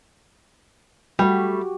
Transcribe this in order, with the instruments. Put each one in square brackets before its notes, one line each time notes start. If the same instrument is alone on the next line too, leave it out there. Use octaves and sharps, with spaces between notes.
[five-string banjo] G3 A3 [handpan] F#4 G4